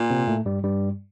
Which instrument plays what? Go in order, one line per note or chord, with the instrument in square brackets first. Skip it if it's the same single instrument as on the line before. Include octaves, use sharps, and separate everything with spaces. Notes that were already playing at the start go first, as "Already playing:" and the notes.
Already playing: [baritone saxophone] A#2
[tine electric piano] C3 C4
A2 A3
G2 G3
G2 G3